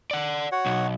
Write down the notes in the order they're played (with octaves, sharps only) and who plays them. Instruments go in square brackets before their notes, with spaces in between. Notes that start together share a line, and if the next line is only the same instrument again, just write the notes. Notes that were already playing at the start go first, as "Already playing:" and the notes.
[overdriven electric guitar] D5 F#5
[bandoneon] F#4 C#5 F#5
[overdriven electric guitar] B1